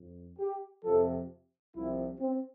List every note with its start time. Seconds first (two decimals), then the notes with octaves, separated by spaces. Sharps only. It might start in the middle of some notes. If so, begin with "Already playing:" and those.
Already playing: F2
0.38 G4
0.84 F2 C3 F3 A4
1.75 C2 C3 F3 E4
2.20 C4